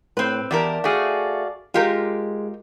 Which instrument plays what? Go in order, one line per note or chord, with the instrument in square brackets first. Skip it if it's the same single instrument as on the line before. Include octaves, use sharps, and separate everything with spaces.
[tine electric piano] A2 [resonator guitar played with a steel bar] C4 B4
[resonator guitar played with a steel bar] E2 G4 A#4 [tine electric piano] D5 A5
[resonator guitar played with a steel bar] A3 G#4 [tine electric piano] F#4 D5 F5
[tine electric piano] G#3 [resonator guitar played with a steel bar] F4 G4 A#4